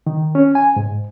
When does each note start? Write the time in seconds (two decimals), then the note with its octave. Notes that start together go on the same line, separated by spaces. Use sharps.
0.07 D#3
0.35 C#4
0.55 G#5
0.76 G#2